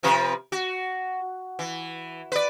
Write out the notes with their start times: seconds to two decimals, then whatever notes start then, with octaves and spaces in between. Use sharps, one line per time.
0.03 C3 F3 B4
0.52 F#4
1.59 E3
2.32 B4 D5